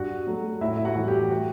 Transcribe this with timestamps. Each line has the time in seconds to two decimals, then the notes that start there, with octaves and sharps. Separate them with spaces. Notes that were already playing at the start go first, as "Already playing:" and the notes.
Already playing: G2 F#4 F#5
0.27 F#3 A3
0.61 A2 E4 E5
0.77 E5
0.85 F#4 F#5
0.96 E3 G3
1.08 G4 G5
1.31 F#4 F#5